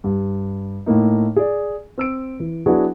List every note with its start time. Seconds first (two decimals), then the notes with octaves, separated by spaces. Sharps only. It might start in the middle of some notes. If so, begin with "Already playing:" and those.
0.04 G2
0.86 A2 A3 A#3 D#4
1.36 G#4 D5
1.98 C4 E6 D7
2.40 E3
2.66 F#3 B3 D4 E4 F#4 G#4